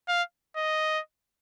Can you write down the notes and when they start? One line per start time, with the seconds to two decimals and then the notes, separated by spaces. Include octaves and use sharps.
0.08 F5
0.57 D#5